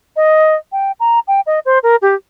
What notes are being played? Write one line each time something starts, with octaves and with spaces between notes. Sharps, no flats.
D#5
G5
A#5
G5
D#5
C5
A#4
G4